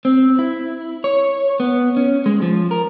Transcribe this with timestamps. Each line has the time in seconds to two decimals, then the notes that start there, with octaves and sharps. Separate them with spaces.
0.05 C4
0.39 E4
1.04 C#5
1.60 B3
1.97 C#4
2.26 G#3
2.42 F3
2.71 A#4